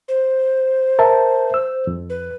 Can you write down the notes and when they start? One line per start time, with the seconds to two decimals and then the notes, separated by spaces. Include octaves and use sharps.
0.08 C5
0.99 A#4 E5 A5
1.54 E6
1.87 F2
2.10 B4